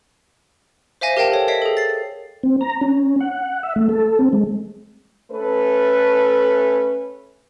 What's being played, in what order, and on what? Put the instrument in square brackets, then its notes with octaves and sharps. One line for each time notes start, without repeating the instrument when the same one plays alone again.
[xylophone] C5 E5 F5 G#5 A#6
G4 A#4 F5 G5 A5
A4 C#5
C#5 D#5 E5 G5 B6 C7
G#4 A4
A6 C7
[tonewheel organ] C4
A#5
C#4
F#5
E5
A3
A4
C4
G#3
[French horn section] A3 C#4 A4 B4